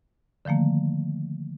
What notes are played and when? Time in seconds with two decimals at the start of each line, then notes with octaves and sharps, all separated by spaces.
0.45 D3 D#3 F3 A3 A#3